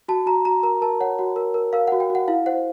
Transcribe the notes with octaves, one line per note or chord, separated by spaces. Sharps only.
F#4 A5
F#4 A#5
F#4 A#5
A#4 A#5
A#4 A5
C#5 F#5
F#4 F#5
A#4
A#4
A#4 F5
F#5
F#4
G5
F#4
F#5
E4 F5
C5 F#5